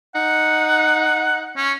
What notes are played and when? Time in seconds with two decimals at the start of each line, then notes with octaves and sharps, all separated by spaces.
0.15 D#4 F#5
1.56 C#4